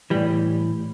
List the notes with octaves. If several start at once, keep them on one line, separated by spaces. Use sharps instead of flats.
A2 E3 G3